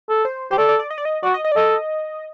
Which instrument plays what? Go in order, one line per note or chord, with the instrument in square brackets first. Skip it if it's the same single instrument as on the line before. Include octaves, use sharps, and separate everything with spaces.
[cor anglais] A4
[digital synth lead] C5
[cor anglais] G4 [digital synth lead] C5
[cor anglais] A4 [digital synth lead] D5
[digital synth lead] D5
D5
D#5
D5
D#5
[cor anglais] F#4 [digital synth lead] D5
[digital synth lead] D#5
D#5
D5
[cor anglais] A4 [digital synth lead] D#5